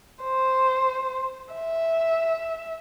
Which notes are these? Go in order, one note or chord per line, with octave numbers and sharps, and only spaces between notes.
C5
E5